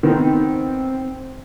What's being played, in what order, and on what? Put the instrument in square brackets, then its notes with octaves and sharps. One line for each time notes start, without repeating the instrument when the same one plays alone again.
[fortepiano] D#3 B3 D#4 [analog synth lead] C4